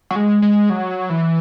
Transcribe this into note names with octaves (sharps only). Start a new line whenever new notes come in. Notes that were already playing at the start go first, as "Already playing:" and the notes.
F#3
G#3
G#3
F#3
E3